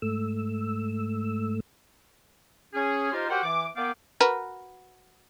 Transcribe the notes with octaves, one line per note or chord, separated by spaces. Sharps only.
G#2 A3 E6
C#4 G#4
D#4 F4 G4 A#4 C5
F#4 G4 A#4 C5 F#5 G5
E3 D6
A#3 B3 F5 G5 D6
F#4 A#4 B4